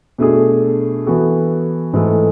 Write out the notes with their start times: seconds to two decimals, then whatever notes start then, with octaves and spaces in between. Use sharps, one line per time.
0.18 B2 A3 D4 G#4
1.06 E3 B3 F#4 A4
1.94 G#2 E3 A3 E4 A4